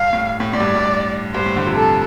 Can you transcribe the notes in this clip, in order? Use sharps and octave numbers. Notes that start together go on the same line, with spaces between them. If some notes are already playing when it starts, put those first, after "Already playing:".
Already playing: G2 F5
A2
A2
A2 D5
G2
G2
G2 C5
A2
A2 D3
C3 F3
A4